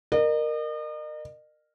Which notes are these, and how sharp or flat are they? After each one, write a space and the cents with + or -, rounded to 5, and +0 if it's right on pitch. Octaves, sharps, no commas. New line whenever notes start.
A#4 +0 D#5 -40